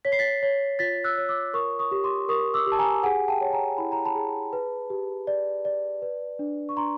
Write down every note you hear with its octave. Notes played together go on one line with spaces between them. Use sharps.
C#5 B6
C7
A6 B6
C#5
F4 A6 B6
E6 F#6
C#5
D6 E6
A#4 C#6 D#6
C#6 D#6
G4
C6 D6
A#4 C#6 D#6
D6 E6
G4
A5
G#5 A#5
G#4 F#5 G#5
G5 A5
C#5
G#5 A#5
E4 B5
A#5
A5 B5
G#4
B4
G4
D5
D5
B4
D4
C#6
D4 A#5 C6